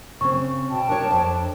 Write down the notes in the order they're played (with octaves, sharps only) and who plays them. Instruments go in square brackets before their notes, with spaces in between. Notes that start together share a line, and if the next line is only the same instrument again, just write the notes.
[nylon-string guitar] C#3 C4 [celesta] C#6
[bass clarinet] B2 [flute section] G5 A5
[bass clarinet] D4 [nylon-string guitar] A#4 C#5
[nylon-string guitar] F2